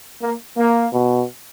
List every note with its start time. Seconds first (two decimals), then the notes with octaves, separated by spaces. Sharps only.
0.22 A#3
0.57 A#3
0.93 B2